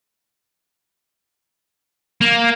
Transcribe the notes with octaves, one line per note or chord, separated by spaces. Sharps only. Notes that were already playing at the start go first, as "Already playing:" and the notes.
A#3